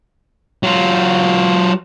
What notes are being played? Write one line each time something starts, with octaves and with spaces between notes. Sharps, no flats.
F#3 F4